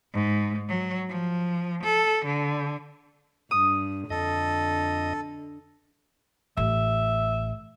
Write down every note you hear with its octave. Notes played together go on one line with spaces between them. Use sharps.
G#2
F#3
F3
A4
D3
G2 D#6
F2 D3 A4 D#5
A1 E5